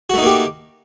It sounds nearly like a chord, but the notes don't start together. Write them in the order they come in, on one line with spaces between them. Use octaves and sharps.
F#4 A3 D#4 A#3 G4